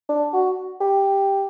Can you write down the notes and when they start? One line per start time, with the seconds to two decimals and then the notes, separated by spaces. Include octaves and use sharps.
0.09 D4
0.34 F#4
0.81 G4